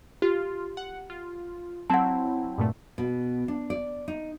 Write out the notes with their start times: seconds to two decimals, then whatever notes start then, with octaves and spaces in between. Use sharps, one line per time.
0.22 F4 G4
0.77 F#5
1.10 F4
1.90 F#3 C4 E4 F#5 A5
2.58 G2 A#2 A3
2.98 B2
3.48 D4
3.70 D5
4.08 D#4